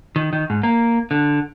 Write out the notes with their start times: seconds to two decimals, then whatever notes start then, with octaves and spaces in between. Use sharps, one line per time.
0.16 D#3
0.33 D#3
0.50 G#2
0.63 A#3
1.11 D3